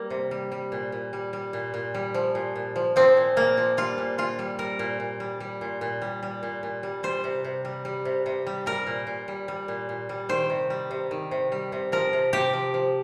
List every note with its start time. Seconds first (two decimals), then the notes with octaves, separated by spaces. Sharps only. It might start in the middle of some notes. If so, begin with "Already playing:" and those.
Already playing: G3 A#3
0.10 C3
0.31 G3
0.52 G3
0.72 A#2
0.92 A#2
1.13 G3
1.33 G3
1.53 A#2
1.74 A#2
1.94 G3
2.14 F3
2.35 A#2
2.55 A#2
2.76 F3
2.96 F3 C4
3.17 A#2
3.36 A#2 A#3
3.57 F3
3.77 G3 F4
3.98 A#2
4.18 A#2 F4
4.39 G3
4.59 G3 A#4
4.79 A#2
5.00 A#2
5.20 G3
5.40 G3
5.61 A#2
5.81 A#2
6.02 G3
6.23 G3
6.43 A#2
6.63 A#2
6.83 G3
7.03 G3 C5
7.24 C3
7.44 C3
7.65 G3
7.85 G3
8.05 C3
8.26 C3
8.47 G3
8.66 G3 A#4
8.87 A#2
9.07 A#2
9.28 G3
9.48 G3
9.68 A#2
9.89 A#2
10.09 G3
10.29 D#3 C5
10.50 C3
10.70 G3
10.91 C3
11.11 D#3
11.31 C3
11.52 G3
11.72 C3
11.92 F3 A#4
12.13 C3
12.33 C3 G4
12.53 F3
12.74 F3